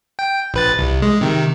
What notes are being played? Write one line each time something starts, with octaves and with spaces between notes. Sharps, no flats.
G5
A#1 B4 A6
C2
G#3
C3 D#3